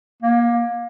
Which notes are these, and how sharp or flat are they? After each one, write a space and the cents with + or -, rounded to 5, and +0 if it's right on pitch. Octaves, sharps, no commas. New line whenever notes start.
A#3 +25